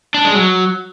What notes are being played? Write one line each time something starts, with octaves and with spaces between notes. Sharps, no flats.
D4
G#3
F#3